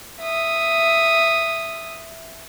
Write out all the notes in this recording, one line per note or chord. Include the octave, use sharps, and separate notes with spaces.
E5 D#6